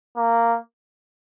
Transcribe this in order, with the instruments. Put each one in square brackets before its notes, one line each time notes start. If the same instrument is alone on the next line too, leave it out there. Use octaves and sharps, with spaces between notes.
[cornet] A#3